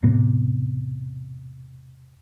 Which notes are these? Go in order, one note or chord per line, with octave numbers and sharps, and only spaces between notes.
E1 A2 C3 B3